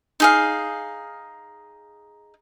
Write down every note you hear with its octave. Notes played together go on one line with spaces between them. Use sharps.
D#4 G#4 F5